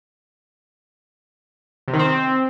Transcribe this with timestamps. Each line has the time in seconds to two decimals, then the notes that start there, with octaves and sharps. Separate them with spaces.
1.88 C3
1.93 D#3
1.99 C4